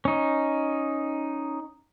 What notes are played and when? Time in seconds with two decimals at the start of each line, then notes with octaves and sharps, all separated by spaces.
0.05 C#4 D#4